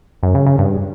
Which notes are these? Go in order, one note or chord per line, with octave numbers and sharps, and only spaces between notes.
F#2
C#3
C#3
G2